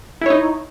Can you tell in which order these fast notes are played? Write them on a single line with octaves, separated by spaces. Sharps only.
E4 C#5 D#4